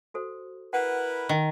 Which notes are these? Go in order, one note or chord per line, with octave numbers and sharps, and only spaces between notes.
F#4 A4 C5
E4 A#4 B4 F#5
D#3